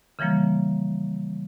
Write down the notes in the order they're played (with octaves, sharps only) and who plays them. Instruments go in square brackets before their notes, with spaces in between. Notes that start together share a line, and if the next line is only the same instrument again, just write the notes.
[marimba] C#3 E3 F3 G3 A#3